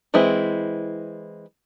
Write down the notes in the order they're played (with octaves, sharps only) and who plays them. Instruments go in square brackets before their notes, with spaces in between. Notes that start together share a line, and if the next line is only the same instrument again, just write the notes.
[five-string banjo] E3 G#3 C4 E4